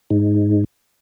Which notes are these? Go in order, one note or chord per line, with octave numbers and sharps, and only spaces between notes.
G#2